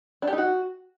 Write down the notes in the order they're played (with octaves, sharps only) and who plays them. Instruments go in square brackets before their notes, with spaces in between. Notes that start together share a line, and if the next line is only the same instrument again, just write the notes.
[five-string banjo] D4
G4
D#4
F#4